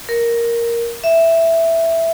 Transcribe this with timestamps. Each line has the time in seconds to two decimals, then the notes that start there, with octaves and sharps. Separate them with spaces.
0.09 A#4
1.04 E5